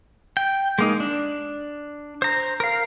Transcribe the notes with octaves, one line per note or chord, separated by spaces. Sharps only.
G5
G#3 A#3 D#4
D4
C5 A#5
A#4 F5